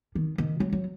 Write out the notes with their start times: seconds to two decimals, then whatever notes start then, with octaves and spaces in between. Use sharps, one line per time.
0.15 D#3
0.38 D#3
0.60 F#3
0.73 F#3